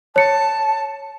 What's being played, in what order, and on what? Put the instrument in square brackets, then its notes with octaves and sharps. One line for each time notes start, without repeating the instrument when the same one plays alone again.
[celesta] C#5 C#7 [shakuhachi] A5